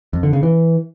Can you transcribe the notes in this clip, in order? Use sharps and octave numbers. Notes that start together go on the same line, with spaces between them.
F2
D3
C#3
E3